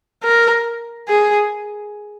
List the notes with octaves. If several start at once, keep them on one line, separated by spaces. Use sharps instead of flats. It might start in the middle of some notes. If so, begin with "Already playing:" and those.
A#4
G#4